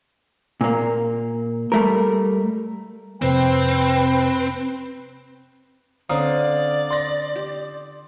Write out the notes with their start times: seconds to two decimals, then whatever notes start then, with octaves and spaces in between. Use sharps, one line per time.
0.61 A#2 A#3
1.72 G3 A3 A#4
3.22 F2 C3 C4 B4 C5 G5
6.09 D3 C4 C#4 D5 F5 A#5 D#6
6.91 C6 A#6
7.36 G4